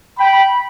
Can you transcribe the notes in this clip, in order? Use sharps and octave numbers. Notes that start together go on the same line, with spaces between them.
G5 B5